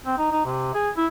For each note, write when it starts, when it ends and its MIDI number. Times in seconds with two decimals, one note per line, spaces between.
0.06 0.18 60
0.18 0.30 63
0.32 0.42 63
0.45 0.71 48
0.74 0.90 68
0.97 1.06 64